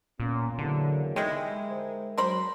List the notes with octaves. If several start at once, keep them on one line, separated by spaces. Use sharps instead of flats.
A#2 A#3 B3 C#4
E2 D3 F#3 A#3
D#3 G3 G#3 E4
A#4 C5
F#3 A#4 C5 B5